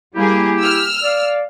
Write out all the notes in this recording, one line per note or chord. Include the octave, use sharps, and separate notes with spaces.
G3 A#3 E4 G4 G#4
E6 F6
D5 F5